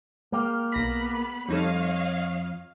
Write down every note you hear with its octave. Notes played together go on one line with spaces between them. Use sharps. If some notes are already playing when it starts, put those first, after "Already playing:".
G#3 A#3 G5 F6
B1 B3 B5 A#6 B6
F2 G3 D#4 A4 C#5 D#5 F5